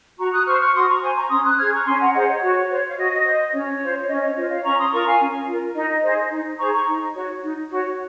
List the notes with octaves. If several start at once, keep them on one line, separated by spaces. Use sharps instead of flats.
F#4 A#5 C#6
D#6 F#6
C5 C#6 F6
C#6 F6
F#4 C6 D#6
A#5 C#6
C5 G#5 C6
A#5 C#6
C#4 C6 D#6
D#6 F#6
G#4 C5 F6 G#6
A#5 C#6
C#4 G#5 C6
F#5 A#5
G#4 C5 D#5 F#5
C#5
F#4
C5
F5
F#4 D#5
C5
C#4 C#5
F4 C5
C#4 D#5
C#5
F4 C5 D#5
C#5 F5
C#4 A#5 C#6
C6 D#6
F4 A#4 A#5 C#6
F5 G#5
C#4
F4 A#4
D#4 D#5
G#4 C5
D#4
G#4 C5 A#5 C#6
A#5 C#6
D#4
F#4 C#5
D#4
F#4
C#5